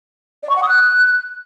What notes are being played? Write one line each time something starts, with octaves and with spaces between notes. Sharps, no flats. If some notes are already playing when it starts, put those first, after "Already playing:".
D5
C#6
F#5
D#6
F#6